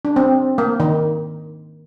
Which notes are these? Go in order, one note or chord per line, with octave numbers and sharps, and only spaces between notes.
D4
C4
A#3
D#3